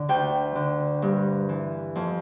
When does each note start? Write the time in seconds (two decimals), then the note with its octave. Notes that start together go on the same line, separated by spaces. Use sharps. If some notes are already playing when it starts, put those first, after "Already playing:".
Already playing: D3
0.09 D2 G5
0.55 D3
1.02 G2
1.49 E3
1.95 F2